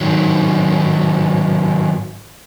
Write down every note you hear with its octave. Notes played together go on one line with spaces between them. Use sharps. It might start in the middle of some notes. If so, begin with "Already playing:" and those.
G#2 D#3 F#3